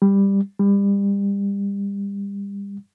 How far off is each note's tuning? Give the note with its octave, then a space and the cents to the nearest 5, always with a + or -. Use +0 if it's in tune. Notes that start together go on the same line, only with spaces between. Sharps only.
G3 +10
G3 +30